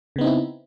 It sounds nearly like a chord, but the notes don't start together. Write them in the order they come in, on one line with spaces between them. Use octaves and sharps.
C#3 B3 D#4 C4 E4